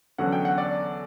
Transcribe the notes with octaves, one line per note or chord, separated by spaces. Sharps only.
E2 D3 F#3 C#4 F#5
G5
F#5
D5